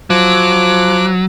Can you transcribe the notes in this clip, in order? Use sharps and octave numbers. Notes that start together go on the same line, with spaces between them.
F3 F#3 D6 F#6